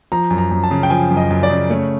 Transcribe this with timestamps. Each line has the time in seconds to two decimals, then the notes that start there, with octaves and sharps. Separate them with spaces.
0.12 F3 A#5
0.30 F#2
0.38 A#5
0.51 F#2
0.64 A5
0.71 C#3
0.83 G5
0.90 F3 G#5
1.11 F#2
1.17 D#5
1.30 F#2
1.43 D5
1.50 C#3
1.70 A3 C#5